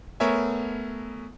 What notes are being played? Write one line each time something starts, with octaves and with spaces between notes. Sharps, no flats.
A3 B3 A#4 C#5 E5 G#5